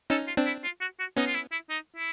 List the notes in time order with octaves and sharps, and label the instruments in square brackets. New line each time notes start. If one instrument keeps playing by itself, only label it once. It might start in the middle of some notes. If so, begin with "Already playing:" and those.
[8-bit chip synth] C#4 D#4 [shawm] A4
[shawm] F4
[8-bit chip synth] C4 D4
[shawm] E4
F4
F#4
F#4
[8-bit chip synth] B3 C#4 [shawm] D#4
[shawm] F4
E4
E4
D#4
E4